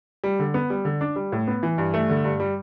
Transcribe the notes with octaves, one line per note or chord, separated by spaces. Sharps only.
G3
D3
B3
G3
D3
D4
G3
A2
B3
E3
G2
A3
D3
G2
G3